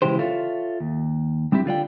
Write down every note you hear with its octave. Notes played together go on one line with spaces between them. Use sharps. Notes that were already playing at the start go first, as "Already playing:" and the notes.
C#3 E3 G#3 E4 G4 C5
F4 A4 C#5 E5 F5
D#2
G3 C4 D4 E4 G4
D3 F4 D5 G5